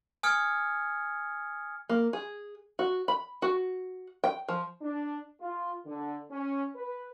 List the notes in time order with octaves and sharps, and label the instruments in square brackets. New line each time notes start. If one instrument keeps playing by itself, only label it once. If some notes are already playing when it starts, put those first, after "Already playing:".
[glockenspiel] G#5 D#6 F6 G#6 C#7
[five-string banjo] A#3
G#4
F#4
B5
F#4
G5
F3
[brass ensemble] D4
F4
D3
C#4
B4